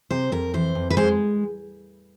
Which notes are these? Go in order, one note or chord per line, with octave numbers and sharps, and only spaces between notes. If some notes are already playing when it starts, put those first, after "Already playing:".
C3 C5
F2 A#4
E3 C5
F2
B4
G#3 C5